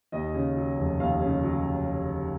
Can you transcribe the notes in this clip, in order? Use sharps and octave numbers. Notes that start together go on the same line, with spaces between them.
D#2 D#5
C#3
F#3
F1
D#2 F5
C#3
F#3